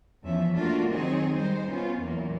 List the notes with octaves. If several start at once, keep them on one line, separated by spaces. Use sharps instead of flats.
E2 F3 C#4 E5
A3 A#3 D4 F4 F#4 A#4
D#3 F#3 C4 D#4 G#4 C#5
G3 G#3 D#4 C5
B2 B3 C#4 F4
E2 A#2 E3 F#3 A#3